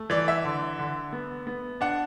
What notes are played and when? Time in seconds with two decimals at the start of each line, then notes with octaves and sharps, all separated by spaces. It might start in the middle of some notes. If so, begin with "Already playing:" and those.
Already playing: A3
0.10 E3 D5
0.28 E5
0.45 D3
0.79 D3
1.13 B3
1.47 B3
1.81 D4 F#5